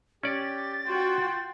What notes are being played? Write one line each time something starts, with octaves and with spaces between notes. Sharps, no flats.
C#4 G4 D5 A6
F4 F#4 G5 C6